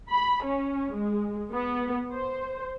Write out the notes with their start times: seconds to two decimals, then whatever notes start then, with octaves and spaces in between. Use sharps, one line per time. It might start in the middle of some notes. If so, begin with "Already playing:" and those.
0.11 B5
0.44 C#4
0.94 G#3
1.54 B3
2.13 C5